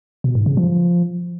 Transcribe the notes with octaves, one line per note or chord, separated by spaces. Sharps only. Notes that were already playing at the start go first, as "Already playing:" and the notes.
B2
G#2
C#3
F3